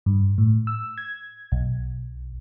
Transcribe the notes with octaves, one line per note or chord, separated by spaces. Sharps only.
G2
A2
E6
G#6
B1